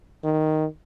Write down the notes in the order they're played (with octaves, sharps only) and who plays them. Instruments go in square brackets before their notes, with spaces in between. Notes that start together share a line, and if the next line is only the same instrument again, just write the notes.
[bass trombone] D#3